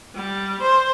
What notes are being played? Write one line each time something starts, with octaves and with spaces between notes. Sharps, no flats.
G3
C5